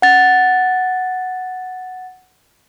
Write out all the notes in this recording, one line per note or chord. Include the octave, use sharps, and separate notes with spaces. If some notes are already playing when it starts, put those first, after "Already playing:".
F#5 A6